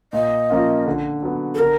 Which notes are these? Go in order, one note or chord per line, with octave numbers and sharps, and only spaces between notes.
A#2 D#5
F3 A#3 C#4 F4
D3
F#3 B3
A4
D3 A#4